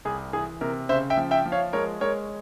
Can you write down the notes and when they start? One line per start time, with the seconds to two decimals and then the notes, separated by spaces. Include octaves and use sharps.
0.05 C2 G#4
0.33 E3 G#4
0.61 C3 A#4
0.89 C#3 C5 E5
1.10 E5 G5
1.17 F3
1.31 E5 G5
1.46 F3
1.52 C#5 F5
1.73 G#3 A#4 C#5
2.01 G#3 A#4 C#5